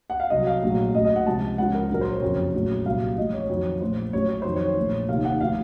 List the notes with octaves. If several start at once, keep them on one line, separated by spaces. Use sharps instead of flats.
F#5
F5
C2 C3 F#3 D#5
F5
A#1 A2 F#3
A1 A2 F#3 D#5
D#5
F#5
C#2 C3 F3 A5
C#2 C#3 F3 F#5
A#4
A#1 A#2 F#3 A#4
C5
C#5
F#1 F2 C3 F#3
A#1 A2 F#3
C2 A#2 F#3 F5
A1 A2 F3 D#5
C#5
F2 D#3 F#3
A#1 A2 F3 C5
A1 A2 F#3 C#5
C#5
F2 D#3 F#3 C5
C#5
A#1 A2 F3
F1 D#2 D#3 F5
F#5
A2 F3 F5